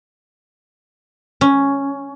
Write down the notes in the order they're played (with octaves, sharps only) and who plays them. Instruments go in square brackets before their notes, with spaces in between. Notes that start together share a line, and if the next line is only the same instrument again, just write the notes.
[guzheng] C#4